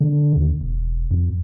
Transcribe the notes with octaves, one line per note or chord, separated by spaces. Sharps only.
D3
D#2
E1
F2